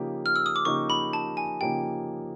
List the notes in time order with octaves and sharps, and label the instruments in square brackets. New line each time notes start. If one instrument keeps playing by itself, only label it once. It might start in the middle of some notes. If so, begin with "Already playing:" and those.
Already playing: [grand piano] C#3 F3 A#3 D#4 G4
[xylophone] F6
E6
D#6
D6
[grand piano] C#3 F3 A#3 D#4 G4 [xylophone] C#6
[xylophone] B5
A5
G#5
[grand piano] C#3 F3 A#3 D#4 G4 [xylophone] G5